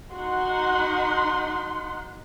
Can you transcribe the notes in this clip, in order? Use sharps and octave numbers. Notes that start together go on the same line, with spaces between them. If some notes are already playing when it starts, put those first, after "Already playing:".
D#4 F#4 F#5 C6